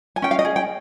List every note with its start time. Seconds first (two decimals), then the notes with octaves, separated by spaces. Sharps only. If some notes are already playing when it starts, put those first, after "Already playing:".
0.16 G#5
0.22 C#4 G5
0.31 F5
0.39 D#5
0.45 G#4
0.56 G5